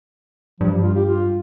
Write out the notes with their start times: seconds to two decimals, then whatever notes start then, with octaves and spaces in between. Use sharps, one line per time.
0.60 G2 F3
0.72 G3
0.83 F4
0.94 G4
1.06 F4